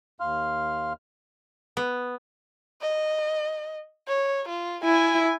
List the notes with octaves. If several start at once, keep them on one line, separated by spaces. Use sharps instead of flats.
D#2 F5 C6 F6
B3
D#5
C#5
F4
E4 G#5